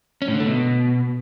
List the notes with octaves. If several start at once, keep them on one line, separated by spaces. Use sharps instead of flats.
C#4
A2
D3
A3
B2